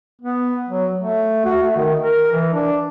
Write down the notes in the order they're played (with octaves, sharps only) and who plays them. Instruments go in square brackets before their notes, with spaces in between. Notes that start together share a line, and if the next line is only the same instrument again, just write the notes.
[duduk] B3
F#3
A3
F#4
A3
D#3
A#4
E3
D4